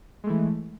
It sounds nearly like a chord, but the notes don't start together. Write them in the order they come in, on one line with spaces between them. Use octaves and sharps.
G#3 A3 E3